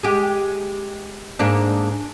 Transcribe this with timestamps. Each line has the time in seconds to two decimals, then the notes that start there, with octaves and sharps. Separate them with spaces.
0.03 G#3 G4
1.39 G#2 A#3 D4